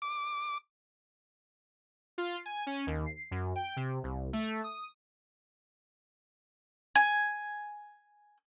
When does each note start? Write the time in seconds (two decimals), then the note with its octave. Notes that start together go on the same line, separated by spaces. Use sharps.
0.02 D6
2.18 F4
2.46 G#5
2.67 C#4
2.87 D#2
3.06 C7
3.31 F#2
3.56 G5
3.76 C3
4.03 C2
4.33 A3
4.64 D#6
6.95 G#5